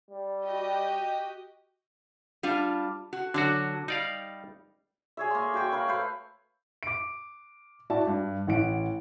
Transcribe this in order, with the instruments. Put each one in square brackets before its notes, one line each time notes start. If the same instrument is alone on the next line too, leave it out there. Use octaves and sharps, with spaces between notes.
[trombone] G3
[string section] F#4 G4 D#5
[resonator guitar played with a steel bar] G3 D4 F4
F#4
[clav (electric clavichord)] D3 F#4 [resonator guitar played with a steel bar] F#3 D4
[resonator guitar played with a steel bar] G3 [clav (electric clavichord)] D#4 D5 F5
[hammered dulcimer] G#4 C#5 E5
A#3 C6
F#4 G5 C#6
A#4 B4 C#5 F5
A3 B4 C5
[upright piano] D6 D7
E4 F#4 D5 E5 A5
G2
A1 F#5 D7